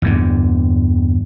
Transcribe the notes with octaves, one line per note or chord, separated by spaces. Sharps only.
E2 G2 D3